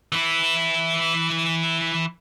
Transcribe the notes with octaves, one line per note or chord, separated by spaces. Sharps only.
E3 E4